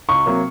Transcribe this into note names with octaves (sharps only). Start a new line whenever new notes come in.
C#2 C#6
C3 F#3 A#3